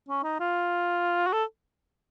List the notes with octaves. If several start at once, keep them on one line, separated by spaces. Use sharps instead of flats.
C#4
D#4
F4
F#4
A4